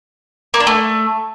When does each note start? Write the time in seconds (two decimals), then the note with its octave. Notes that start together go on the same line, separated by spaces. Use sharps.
0.54 A#3
0.60 D4
0.67 A3